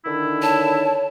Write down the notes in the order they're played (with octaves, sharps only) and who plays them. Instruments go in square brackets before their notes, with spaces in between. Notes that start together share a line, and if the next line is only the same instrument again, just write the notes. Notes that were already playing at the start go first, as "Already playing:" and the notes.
[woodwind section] D3 D#3 E4
[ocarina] C#5 [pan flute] A5